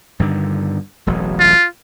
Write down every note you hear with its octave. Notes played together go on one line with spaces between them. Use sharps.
G2 D3 D#3
E1 A1 F#3
F4